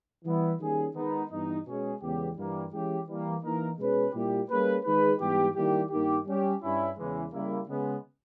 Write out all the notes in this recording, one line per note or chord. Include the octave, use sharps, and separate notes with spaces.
E3 G3 B3 E4
D#3 G3 A#3 C#4 G#4
D#3 G#3 B3 D#4
G2 E3 G3 B3 D#4
B2 G#3 C#4 G#4
E2 C#3 G#3 B3 G4
G2 E3 G3 A#3
E3 G#3 C#4 E4 G4
E3 G3 A#3
E3 A#3 D#4 A#4
B2 G#3 C#4 G#4 B4
A#2 G3 A#3 E4 G4
G3 A#3 C#4 G#4 B4
D#3 G#3 D#4 G#4 B4
G#2 E3 G3 B3 G4
D#3 G3 A#3 E4 G4
G2 D#3 A#3 D#4 G4
G3 C#4 G4
G2 G3 C#4 E4
E2 C#3 E3 G#3
C#3 G3 A#3 E4
C#3 G#3 B3